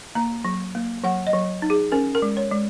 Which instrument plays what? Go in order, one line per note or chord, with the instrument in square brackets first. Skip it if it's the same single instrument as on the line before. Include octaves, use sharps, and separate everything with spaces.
[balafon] A#3 A#5
F#3
A#3
F#3 F#5
D#5
F#3
D#4
G#4
C#4 A#4
A#4
G#3
C#5
G#3